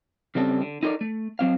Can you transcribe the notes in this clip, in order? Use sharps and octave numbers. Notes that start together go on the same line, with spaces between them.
C#3 G3 C4 A4
D3
D#4 E4 A4 A#4 D5
A3
F#3 C4 F5